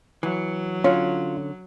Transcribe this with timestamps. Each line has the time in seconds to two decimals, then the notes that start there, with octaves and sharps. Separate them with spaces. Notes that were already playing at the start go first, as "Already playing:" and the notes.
0.23 E3 F#3
0.84 D3 C#4 F4 C#5 F5